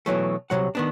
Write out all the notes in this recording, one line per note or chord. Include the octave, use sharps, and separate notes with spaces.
B2 E3 F#3 A3
C2 F#2 C3 F#3 F#5
D#3 B3 D4